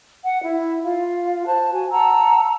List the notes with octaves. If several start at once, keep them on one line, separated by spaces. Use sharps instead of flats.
F#5
E4
F4 F5
C5 A5 F#6
F#4 G#5
F#5 A5 A#5 E6